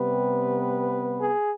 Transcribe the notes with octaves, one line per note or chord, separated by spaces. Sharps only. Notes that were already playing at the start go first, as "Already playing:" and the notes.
Already playing: C3 G3 B3 B4
G#4